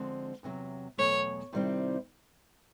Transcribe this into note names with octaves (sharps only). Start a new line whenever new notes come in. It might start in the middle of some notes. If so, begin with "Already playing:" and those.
Already playing: D3 F3 G#3 C4
E2 C3 D#3 F#3
E2 B2 F#3 A3 C#5
C3 D#3 G3 C4 E4